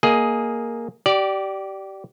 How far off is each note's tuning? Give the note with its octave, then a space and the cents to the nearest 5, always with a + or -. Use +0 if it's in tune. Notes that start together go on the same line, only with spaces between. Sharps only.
A#3 +0 G#4 +10 D#5 +0
G4 -25 D5 +0